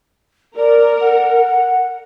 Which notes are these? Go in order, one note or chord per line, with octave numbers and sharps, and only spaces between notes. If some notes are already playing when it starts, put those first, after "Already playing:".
A#4 D5
F#5